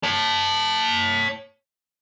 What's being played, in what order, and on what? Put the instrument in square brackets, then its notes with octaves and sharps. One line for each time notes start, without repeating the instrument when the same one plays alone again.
[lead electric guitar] C#5 A5